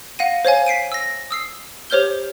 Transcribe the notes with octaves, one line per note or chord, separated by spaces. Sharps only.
F5 F#5 A#6 D#7
C5 C#5 F5 G#5
B6 C7 D7 D#7
E6 A#6
D#6 E6 C7
G4 C5 C#5 F6 G6 G7